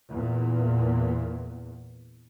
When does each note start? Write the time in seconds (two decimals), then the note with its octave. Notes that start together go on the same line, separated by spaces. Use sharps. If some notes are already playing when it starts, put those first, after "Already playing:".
0.11 E2 A#2